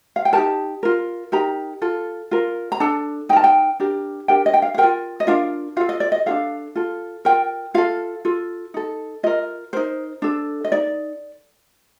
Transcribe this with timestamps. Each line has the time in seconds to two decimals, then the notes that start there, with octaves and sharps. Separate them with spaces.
0.16 F5
0.25 G5
0.33 D#4 G4 A#4 A5
0.83 F4 A#4
1.32 D#4 G4 A#4 A#5
1.82 F4 A4
2.31 F4 A#4
2.72 A#5
2.80 D4 A4 A5
3.29 D#4 G5
3.33 A#4 A5
3.44 G5
3.80 D4 G4 A#4
4.28 D4 G4 A#4 G5
4.46 D#5
4.54 G5
4.62 F5
4.74 F5
4.78 A#4 G5
4.83 F4
5.20 D#5
5.27 D4 F4 A#4 F5
5.77 F4 A4 F5
5.89 D#5
6.00 D5
6.12 D#5
6.26 D4 F4 A4 F5
6.75 F4 A4
7.25 F4 A#4 G5
7.74 F4 A4 F5
8.25 F4 A4
8.74 D#4 A4
9.23 F4 A#4 D#5
9.73 D#4 A#4 C5
10.22 D4 A4
10.64 D#5
10.72 D#4 D5